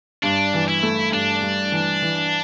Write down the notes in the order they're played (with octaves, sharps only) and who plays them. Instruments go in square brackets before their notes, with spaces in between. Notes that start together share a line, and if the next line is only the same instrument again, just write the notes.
[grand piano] G2 [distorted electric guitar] D4
[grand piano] E3
[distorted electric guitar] E4
[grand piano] A3
[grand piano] G2 [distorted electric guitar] D4
[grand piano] G2
E3
E3